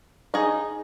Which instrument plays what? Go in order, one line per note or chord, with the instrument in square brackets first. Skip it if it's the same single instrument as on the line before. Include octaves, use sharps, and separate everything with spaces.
[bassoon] D#4 [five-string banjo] G#4 D#5